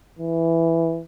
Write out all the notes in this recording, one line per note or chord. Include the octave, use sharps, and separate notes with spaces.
E3